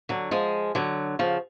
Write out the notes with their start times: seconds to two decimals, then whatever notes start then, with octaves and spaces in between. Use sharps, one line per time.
0.09 D3 F#3
0.31 F3 G#3
0.75 D3 F#3
1.19 C#3 F3